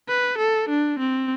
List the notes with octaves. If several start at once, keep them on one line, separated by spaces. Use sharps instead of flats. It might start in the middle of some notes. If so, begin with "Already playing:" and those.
B4
A4
D4
C4